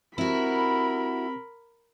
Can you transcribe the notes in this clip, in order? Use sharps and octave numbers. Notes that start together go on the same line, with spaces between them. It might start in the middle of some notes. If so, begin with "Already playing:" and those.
C4 E4 F#4 G4 A#4 B5